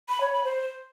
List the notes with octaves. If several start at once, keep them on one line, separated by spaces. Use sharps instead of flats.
B5
C#5
B5
C5